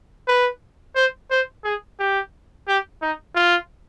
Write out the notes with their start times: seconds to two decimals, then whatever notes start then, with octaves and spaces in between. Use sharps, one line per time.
0.28 B4
0.95 C5
1.31 C5
1.64 G#4
1.99 G4
2.68 G4
3.01 D#4
3.35 F4